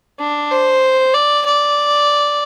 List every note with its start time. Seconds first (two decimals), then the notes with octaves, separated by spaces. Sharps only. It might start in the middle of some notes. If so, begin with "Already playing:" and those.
0.20 D4
0.52 C5
1.14 D5
1.45 D5